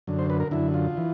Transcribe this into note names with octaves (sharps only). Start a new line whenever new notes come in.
F#2 D3
C5
B4
A#4
F#2 D3 E4
F4
E3